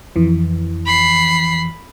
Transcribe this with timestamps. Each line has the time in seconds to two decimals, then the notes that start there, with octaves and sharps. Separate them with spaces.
0.16 F2 E3
0.86 B5 C7